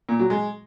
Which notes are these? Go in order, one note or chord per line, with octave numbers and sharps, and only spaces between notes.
A#2
F#3
G#3